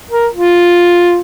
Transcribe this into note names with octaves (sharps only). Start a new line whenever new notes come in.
A#4
F4